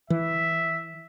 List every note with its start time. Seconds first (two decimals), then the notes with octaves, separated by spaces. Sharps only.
0.10 E3 E5